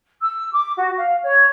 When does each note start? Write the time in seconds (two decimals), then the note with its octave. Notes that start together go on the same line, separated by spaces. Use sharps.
0.21 E6
0.52 D6
0.78 F#4
0.99 F5
1.23 C#5